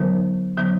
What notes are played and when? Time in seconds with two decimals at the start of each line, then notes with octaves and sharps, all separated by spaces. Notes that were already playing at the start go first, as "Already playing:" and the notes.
Already playing: D3 F#3 B3 D#4 A#4
0.57 D3 F#3 B3 D#4